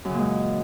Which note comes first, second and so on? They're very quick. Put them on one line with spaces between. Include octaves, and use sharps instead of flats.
F#2 C#3 A#2 G#3